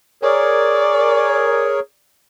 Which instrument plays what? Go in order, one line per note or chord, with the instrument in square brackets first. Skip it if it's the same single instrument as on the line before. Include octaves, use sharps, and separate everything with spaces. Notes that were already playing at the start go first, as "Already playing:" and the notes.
[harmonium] G#4 A#4 C#5 [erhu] D5